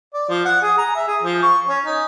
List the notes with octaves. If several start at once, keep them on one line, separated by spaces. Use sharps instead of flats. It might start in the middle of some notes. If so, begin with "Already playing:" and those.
D5
F3
F#5
G#4
A#5
E5
G#4
F3
C#6
C#4
D#4